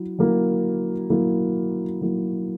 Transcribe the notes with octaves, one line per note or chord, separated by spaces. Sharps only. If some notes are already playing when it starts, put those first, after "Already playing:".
Already playing: F#3 E4
F#3 A#3 E4
F#3 A#3 E4
F#3 A#3 E4